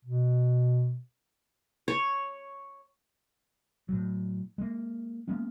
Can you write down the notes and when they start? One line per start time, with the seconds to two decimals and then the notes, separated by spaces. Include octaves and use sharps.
0.05 B2
1.88 C#5
3.89 A2 F#3
4.58 G#3 A#3
5.28 G#3 A#3 B3 C#4